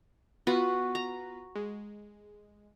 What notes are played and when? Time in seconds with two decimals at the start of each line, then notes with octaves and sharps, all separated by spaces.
0.47 B3 F4 F#4 B4
0.95 A#5
1.55 G#3